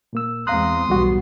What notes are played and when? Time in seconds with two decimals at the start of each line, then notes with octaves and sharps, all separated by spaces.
0.13 A#2 A#3 E6
0.47 E2 G#3 C4 F5 A#5 C6 D#6 F#6
0.89 B1 E2 A2 G3 B3 F#4